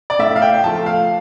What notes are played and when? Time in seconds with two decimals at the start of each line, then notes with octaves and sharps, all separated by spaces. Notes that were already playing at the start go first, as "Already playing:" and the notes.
0.10 D5
0.19 A2 E5
0.36 F5
0.42 G5
0.64 F3 A3 A5
0.86 F5